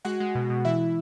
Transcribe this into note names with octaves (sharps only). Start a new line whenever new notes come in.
G#3 F#4 F#5
G#3
B2
B2
E3 E4 E5